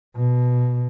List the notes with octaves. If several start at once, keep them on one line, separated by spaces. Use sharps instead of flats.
B2